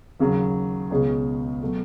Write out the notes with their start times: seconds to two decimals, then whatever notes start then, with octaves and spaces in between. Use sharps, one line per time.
0.20 D#2 C#3 F#3
0.90 C#2 B2 G#3 C#4 G#4
1.61 B2 F#3 A3